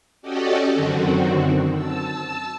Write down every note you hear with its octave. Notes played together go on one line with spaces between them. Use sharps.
C#4 F#4 G4 A4 D5 D#5
F#2 D3 D#3 C4 F#4
A5 E6